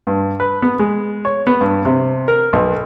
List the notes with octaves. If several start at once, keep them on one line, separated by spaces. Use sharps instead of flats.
G2
B4
B3
G#3
C#5
B3
G2
C3
A#4
B1